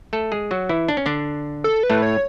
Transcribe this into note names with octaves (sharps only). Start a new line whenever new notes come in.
A3 A4
G#3 G#4
F#3 F#4
E3 E4
D4
C#4
D3 D4
A4
B4
A2 A3
C#5